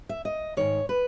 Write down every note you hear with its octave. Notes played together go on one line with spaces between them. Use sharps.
E5
D#5
G#2 D#3 C#5
B4